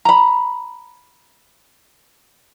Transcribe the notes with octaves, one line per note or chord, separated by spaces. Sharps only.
A#5 B5